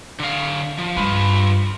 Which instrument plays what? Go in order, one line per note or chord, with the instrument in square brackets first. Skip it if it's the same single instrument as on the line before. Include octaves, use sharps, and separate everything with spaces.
[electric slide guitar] D3 F5
F3
[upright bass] G2 [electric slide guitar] F4 B4